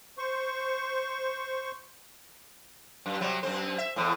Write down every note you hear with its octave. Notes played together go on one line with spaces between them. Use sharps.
C5 C#6
F#2
C3 F#3 G3
F#2 C4 C5
E5
E2 A2